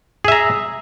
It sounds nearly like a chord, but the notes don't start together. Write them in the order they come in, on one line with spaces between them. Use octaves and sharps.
G#4 E5 A#5